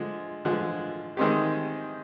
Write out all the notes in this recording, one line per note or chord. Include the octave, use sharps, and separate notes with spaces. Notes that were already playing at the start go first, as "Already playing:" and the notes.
Already playing: D3 F3 G#3
D3 F3 G#3
D#3 G#3 C4 D#4 G4